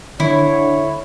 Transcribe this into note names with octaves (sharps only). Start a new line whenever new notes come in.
D3 E4 C#5